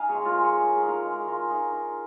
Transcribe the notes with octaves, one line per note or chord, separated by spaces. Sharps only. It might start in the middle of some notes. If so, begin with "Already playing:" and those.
Already playing: D#4 D#5 F5 G#5 A#5
G#4 C#5
G#3
F4 A#4
G#3
G#4 C#5
D#4 A#4
G#4
D#4 F4 A#4
G#3
G#3 F4 A#4
D#4
D#4